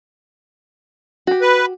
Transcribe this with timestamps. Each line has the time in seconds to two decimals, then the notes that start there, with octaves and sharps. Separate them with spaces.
1.27 F#4 G4
1.41 B4